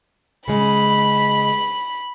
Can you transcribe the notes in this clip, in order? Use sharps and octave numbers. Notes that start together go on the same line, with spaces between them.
C#3 G#3 B5